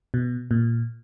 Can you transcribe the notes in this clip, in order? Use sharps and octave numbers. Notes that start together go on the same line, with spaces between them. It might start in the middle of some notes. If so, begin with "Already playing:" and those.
B2
A#2